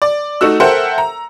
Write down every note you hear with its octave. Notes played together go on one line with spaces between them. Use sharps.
D5
A3 D#4 F#4 E6
A4 A#4 C5 E5 F#5 G5
A#5